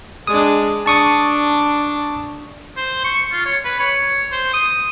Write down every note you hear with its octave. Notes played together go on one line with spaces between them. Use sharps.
G#3 D4 D#6
D4 A5 C#6 D#6
C5
C#6
F4
C#5
B4
C#5
C5
D#6